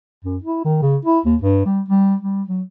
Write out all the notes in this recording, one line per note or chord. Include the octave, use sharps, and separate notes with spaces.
F#2
E4
D#3
C#3
E4
D#2
G2
G3
G3
G3
F#3